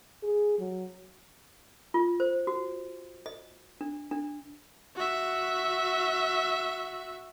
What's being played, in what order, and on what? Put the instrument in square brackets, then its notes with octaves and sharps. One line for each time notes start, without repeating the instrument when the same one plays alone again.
[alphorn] G#4
F#3
[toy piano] F4
C5
F#4
D#5
D4
D4
[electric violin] F#4 E5